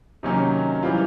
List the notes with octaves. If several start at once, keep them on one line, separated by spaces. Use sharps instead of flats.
C3 D#3 F#3 A#3 C#4
E3 G3 C4 F4